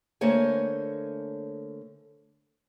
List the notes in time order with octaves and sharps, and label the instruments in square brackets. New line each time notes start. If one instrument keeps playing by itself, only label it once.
[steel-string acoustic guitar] D3 A3 A#3 C5 C#5 G#5